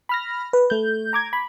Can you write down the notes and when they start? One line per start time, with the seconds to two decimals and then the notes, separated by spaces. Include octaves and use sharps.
0.09 B5 F6 A#6
0.53 B4
0.70 A3 G6
1.13 A#5 D6 G#6
1.33 B5